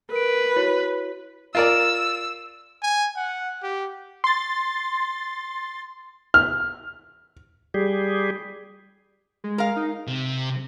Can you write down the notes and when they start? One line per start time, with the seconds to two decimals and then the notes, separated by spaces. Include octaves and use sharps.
0.11 A#4 B4 D7
0.56 E4 F#4 C#5
1.55 F4 A#4 D5 E6
2.83 G#5
3.16 F#5
3.63 G4
4.24 C6 A6
6.34 F6
7.74 G3 G4 G#4
9.44 G#3
9.58 A#4 F5
9.76 D#4
10.07 C3